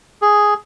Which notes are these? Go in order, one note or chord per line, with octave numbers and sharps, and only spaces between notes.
G#4